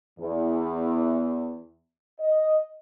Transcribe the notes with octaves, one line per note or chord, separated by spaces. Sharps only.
E2
D#5